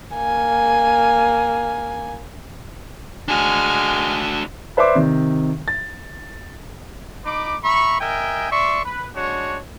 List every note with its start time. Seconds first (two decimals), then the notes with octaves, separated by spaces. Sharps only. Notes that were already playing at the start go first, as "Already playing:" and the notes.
0.16 A#3 G#5
3.28 G#3 D4 F#4 G#5 F6
4.77 B4 C5 D5 E5 C6 D6
4.95 C3 D#3
5.68 A6
7.25 D#4 B5 D6
7.64 E5 A#5 B5 C#6
7.99 A#4 D#5 E5 G5 G#5
8.51 D5 E5 C6 C#6
8.85 B4
9.15 G#3 D4 F#4 C#5